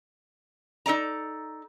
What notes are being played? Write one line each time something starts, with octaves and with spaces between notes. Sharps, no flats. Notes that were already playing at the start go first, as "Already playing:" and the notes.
D#4 A4 D5 A#5